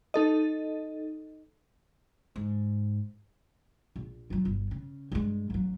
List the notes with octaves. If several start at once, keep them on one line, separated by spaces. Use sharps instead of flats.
D#4 A4 D#5
G#2
A#1
F#3 F4
G1
C#3
G2 G#3
A1 F#3